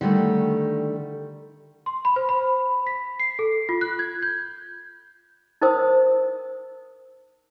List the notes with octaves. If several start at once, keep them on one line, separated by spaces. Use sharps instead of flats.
D3 D#3 G3 A3
C6
B5
C5
B5
B6
C7
A4
F4
F#6
G#6
G6
D#4 A#4 C5 G5 D#6 E6